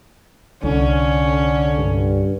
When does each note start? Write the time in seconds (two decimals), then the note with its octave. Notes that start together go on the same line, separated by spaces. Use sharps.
0.64 C2 D3 C#4
1.78 G2